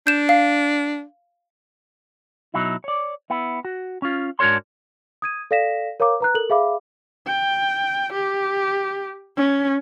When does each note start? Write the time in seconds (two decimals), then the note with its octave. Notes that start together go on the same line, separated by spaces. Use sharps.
0.07 D4 G6 E7
0.29 F5
2.54 B2 F#3 D#4 E4
2.84 C#5 D5
3.30 B3 E4
3.65 F#4
4.02 C#4 F4
4.39 G#2 D4 F#4 A#4 C#5 C6
5.22 D#6 G#6 D#7
5.51 A4 D5 F5 A#6 B6 E7
6.00 A#4 C#5 F5 A#5 D6
6.20 B4 A#5 F#6
6.35 A4 A#4 F#7
6.50 G#4 C5 E5 F5 B5 D6
7.27 G5
8.12 G4
9.37 C#4